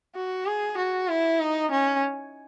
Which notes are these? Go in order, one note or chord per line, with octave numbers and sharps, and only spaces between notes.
F#4
G#4
F#4
E4
D#4
C#4